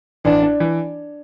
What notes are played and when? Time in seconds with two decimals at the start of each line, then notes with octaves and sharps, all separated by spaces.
0.25 A1 D4
0.43 D4
0.60 E3